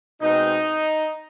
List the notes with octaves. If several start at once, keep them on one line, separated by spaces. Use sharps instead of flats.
B2 G#3 C4 D#4